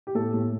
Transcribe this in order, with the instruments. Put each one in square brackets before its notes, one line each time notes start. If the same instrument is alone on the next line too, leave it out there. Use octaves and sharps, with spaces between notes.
[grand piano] G4
A2 A4
A2